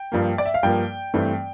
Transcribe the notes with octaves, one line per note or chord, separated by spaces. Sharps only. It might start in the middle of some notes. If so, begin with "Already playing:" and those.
Already playing: G5
G2 F3 A#3
D5
E5
F5
G2 F3 A#3 G5
G2 E3 A3 C4